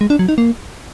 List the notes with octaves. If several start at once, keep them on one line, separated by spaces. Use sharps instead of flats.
G#3
D4
F#3
D#4
A#3